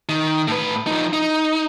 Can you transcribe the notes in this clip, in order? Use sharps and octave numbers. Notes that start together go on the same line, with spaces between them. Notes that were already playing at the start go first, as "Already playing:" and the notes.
D#3
A2 B4
F3 D#4
D#4